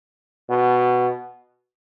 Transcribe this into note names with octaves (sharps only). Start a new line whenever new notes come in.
B2